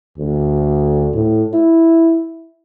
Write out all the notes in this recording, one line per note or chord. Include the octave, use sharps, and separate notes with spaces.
D2
A2
E4